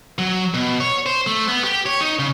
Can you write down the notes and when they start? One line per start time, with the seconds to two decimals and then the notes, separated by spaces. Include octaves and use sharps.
0.18 F#3
0.54 B2
0.80 C#5
1.06 C5
1.27 A3
1.48 B3
1.64 G4
1.86 C#5
2.01 D#4
2.19 C#3